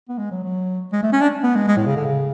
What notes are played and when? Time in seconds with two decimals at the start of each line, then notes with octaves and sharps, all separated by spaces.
0.09 B3
0.18 G#3
0.31 F#3
0.44 F#3
0.92 G#3
1.03 A3
1.12 C#4
1.21 D4
1.43 B3
1.55 G#3
1.68 G#3
1.77 A2
1.86 C#3
1.96 D3
2.05 C#3